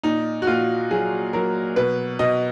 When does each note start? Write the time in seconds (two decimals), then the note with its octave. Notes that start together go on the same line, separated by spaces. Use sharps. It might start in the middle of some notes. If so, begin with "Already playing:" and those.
0.04 A#2 D#4
0.42 F#4
0.47 A#2 F4
0.91 F#3 G#4
1.33 F#3 A#4
1.76 B2 B4
2.19 B2 D#5